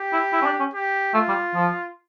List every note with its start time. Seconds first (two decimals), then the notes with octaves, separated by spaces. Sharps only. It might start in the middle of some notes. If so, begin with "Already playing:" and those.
Already playing: G4
0.13 E4
0.33 E4
0.42 C#4
0.46 D4
0.60 C#4
0.74 G4
1.14 A3 F4
1.28 G3
1.55 F3